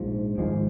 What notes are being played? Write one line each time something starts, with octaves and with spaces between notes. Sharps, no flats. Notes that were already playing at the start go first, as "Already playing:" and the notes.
Already playing: A#1 G#2 F3
G#1 G#2 F3 G#3